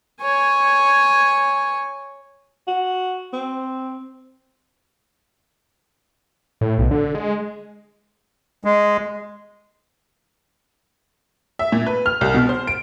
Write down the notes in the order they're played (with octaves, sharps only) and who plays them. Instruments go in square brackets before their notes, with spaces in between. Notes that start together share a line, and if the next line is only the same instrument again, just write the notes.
[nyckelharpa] C#5 G#5
[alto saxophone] F#4
C4
[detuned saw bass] A2
B1
D3
G#3
[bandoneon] G#3
[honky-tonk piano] E5
A#2
B4
F6
C2
B2
C5
D7